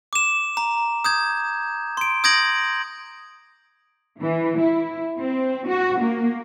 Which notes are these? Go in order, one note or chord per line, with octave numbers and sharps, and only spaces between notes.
D6 E7
A#5
D#6 G6 G#6
C6 D7
D#6 G6 G#6 A#6 D7 F#7
E3
E4
C4
F#4
A#3